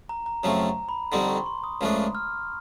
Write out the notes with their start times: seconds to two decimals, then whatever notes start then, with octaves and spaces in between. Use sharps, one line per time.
0.09 A#5
0.26 A#5
0.43 F#2 C#3 F3 A3 C4 A#5
0.89 B5
1.12 F2 D3 G3 C4 D#4 C6
1.29 C#6
1.46 C6
1.64 D#6
1.81 C#2 C#3 F3 A3 D4
2.15 F6